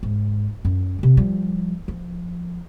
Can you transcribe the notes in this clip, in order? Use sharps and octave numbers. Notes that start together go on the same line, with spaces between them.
G#2
F#2
C3 D#3
F3 G3
F3